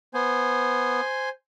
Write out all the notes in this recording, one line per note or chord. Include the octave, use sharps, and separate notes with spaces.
B3 C5 G#5